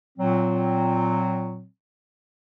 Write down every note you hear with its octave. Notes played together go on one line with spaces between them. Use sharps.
A#2 F#3 C4